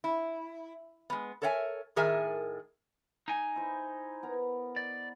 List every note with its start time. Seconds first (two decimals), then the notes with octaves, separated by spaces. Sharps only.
0.04 E4
1.10 G#3 B3
1.42 A4 A#4 C#5 E5 F5 G#5
1.96 A2 D#3 G#4 A#4 E5 G#5
3.28 D#4 G#5
3.56 E4 C5 D#5
4.23 B3 A#4 A#5
4.76 D5